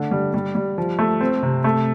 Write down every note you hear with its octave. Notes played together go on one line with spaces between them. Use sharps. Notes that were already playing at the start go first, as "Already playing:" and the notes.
Already playing: D3 A3
G3
G3
G3
F3
A3
C4
C3
A3